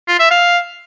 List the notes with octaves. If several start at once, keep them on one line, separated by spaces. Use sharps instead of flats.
F4
E5
F5